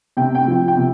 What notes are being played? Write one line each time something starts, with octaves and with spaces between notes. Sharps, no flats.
C3 G5
G5
F3 G5
G5
C3